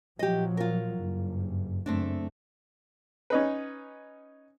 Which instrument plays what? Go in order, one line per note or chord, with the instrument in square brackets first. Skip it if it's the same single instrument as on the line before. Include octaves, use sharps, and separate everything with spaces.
[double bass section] A#2 F3 F#3 [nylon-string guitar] G4 D#5
[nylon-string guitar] F4 A#4
[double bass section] F#1 G2
[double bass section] F#1 [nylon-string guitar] A3 C4 D4
[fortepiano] C#4 D#4 B4